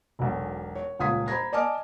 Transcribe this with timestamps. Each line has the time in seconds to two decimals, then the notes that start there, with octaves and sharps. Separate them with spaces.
0.19 E1 B1
0.75 C#5
0.99 D#1 C#2 F4 D#6 G#6 B6
1.28 C5 A#5 B5 G#6 A#6
1.53 D5 D#5 G#5 A5 D6 F6